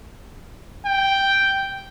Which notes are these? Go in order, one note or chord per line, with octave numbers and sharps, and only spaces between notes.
G5